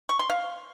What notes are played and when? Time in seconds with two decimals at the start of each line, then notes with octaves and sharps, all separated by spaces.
0.09 C#6
0.19 C6
0.30 F5